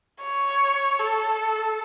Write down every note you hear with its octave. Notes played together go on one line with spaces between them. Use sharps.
C#5
A4